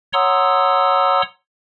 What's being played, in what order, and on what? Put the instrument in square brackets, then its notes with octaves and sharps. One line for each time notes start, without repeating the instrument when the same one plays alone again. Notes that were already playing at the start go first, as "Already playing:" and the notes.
[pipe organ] C#5 F#5 A#5 C6 D#6 E6